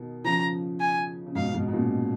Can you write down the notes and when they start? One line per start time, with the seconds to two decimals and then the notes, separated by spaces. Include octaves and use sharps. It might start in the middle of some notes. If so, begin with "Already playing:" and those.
Already playing: B2 D#3
0.24 C#3 F3 A#5
0.80 G#5
1.27 C#3
1.35 G#2 B2 F5
1.54 G#2 B2
1.68 B2
1.73 A#2 C#3